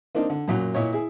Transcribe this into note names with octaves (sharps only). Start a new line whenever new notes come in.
A#3 C4 D4 D#4
D3
F#2 A#2 F#3
A#2 E4 C#5 D#5
E4 G#4